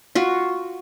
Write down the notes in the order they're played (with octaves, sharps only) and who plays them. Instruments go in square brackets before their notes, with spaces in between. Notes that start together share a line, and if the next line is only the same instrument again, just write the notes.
[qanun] F4 F#4